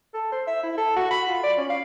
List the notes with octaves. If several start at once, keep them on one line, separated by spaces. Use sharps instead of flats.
A4
C5
E5
E4
A4
F#4
B5
F4
D5
C#4
F5